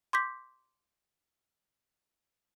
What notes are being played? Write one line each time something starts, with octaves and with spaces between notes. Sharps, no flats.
C6 D6 G6 B6